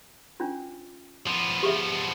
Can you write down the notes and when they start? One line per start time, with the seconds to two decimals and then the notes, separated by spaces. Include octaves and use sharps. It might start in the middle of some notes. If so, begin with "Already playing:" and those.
0.40 C#4 D4 F4
1.27 F3 B3
1.63 G4 G#4 E5